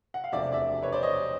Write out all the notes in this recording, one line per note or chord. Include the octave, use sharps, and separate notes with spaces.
F#5
F5
E1 D2 C3 F3 D5 E5
D5 E5
B4 C#5
C5 D5
C#5 D#5